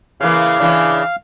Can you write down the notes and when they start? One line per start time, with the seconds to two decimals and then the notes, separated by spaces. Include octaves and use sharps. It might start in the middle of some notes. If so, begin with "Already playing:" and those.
0.21 C#3 E3 A#3 F5
0.60 C#3 E3 D4